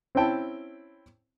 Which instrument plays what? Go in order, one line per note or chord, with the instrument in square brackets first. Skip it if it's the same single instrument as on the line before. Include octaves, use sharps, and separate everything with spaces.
[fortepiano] C4 C#4 E4 G5 A5